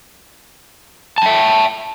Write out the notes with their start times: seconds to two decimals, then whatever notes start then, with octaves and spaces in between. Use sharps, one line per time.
1.18 A5
1.22 G5
1.26 E5